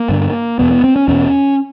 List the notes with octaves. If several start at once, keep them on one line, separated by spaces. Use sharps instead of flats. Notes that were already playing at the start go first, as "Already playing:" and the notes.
Already playing: A#3
G2 D3
E2 B2 B3
B3
C4
C#4
E2 B2 C#4